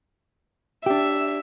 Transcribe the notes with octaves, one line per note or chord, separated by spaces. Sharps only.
D4 G4 E5